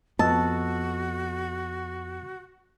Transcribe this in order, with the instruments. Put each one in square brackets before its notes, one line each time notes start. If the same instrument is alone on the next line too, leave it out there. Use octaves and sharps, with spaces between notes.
[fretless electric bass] F2 [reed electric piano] B3 D#5 E6 [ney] F#4 [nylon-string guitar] A5